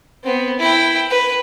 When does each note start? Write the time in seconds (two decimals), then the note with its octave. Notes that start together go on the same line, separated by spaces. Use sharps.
0.24 B3 C4
0.59 E4 G5
1.10 B4